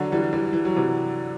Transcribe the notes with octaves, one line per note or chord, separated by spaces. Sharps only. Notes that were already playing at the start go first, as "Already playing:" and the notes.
Already playing: D3 F#3
E3 G3
E3 G3
E3
F#3
C3 E3